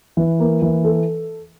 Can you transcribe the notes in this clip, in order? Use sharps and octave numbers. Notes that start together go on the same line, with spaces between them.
E3
A#3
E3
A4